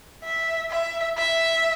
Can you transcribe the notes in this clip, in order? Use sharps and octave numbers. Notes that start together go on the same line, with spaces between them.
E5
E5
E5